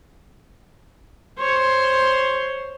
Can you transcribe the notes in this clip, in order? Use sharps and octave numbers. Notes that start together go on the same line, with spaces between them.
C5 C#5 C6